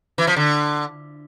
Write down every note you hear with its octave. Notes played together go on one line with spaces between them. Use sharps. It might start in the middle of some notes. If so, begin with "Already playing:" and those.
E3
F3
D3